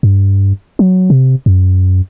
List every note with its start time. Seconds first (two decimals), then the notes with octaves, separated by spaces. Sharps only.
0.03 G2
0.79 F#3
1.10 C3
1.46 F#2